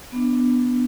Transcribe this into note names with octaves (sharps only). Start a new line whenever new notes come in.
B3 D4